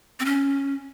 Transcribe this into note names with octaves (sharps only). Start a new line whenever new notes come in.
C4
C#4